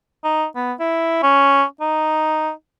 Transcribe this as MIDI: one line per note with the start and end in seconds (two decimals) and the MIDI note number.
0.24 0.46 63
0.56 0.73 59
0.80 1.18 64
1.23 1.64 61
1.81 2.51 63